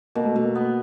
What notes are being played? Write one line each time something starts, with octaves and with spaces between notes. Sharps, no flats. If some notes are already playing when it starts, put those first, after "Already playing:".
B2 A#3
A3
B2 A3
A#3
B3